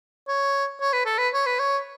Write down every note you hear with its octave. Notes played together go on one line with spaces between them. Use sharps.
C#5
C#5
B4
A4
B4
C#5
B4
C#5